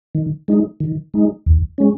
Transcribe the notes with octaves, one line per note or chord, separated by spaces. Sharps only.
D#3
G#3 D#4
D#3
G#3 D#4
D#2
G#3 C#4